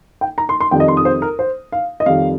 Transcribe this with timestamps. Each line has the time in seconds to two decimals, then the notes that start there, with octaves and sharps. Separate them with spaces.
0.21 G5
0.38 A#5
0.49 C6
0.60 C6
0.71 F2 D#3 G3 G5
0.80 D#5
0.88 C6
0.97 D#6
1.05 C5
1.22 A#4
1.39 C5
1.72 F5
2.00 D#5
2.06 F2 D#3 G3 F5